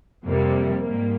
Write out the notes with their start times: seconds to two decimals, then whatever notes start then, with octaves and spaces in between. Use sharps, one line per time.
0.25 F2 C3 G3 A#3
0.83 G#2 G3 A#3